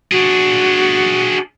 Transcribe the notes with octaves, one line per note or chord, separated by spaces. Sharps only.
D4 F#4 G#4